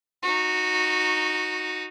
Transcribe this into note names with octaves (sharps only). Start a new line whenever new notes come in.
D#4 F#4